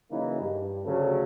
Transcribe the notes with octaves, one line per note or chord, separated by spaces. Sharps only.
C#3 E3 F#3 A#3 D#4
G2
D2 C#3 F#3 F#4 G4 A4